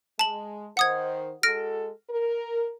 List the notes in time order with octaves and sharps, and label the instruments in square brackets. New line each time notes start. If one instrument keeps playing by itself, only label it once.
[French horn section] G#3 [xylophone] A5 F#7
[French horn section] D#3 C5 [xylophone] F#5 D#6 G#6
[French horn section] G#3 F#4 A4 [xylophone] F6 A#6 D7
[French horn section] A#4